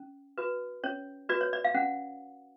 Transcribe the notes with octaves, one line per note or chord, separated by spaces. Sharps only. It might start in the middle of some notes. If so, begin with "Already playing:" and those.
Already playing: C#4
F#4 B4
C#4 C#5
F#4 B4 D5
C#5
D5
F5
C#4 F#5